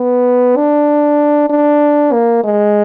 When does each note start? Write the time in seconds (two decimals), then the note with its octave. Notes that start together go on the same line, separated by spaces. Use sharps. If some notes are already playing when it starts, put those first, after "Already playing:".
Already playing: B3
0.56 D4
1.50 D4
2.13 A#3
2.44 G#3